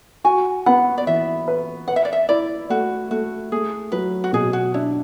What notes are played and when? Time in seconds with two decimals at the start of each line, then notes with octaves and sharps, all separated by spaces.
0.24 F#4 G#5
0.66 B3 F#5
0.98 D5
1.07 E3 E5
1.48 B4
1.88 B4 F#5
1.96 E5
2.05 D5
2.13 E5
2.29 E4 D5
2.70 A3 F#4
3.11 A3 F#4
3.52 A3 G#4
3.92 F#3 B4
4.24 F#4
4.33 B2 G#4
4.53 F#4
4.74 D4 E4